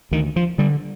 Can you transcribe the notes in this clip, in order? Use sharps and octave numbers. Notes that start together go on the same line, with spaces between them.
D2 D#3
F3
D3 G3